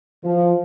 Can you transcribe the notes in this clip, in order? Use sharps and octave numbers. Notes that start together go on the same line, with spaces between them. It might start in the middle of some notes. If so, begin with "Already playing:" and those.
F3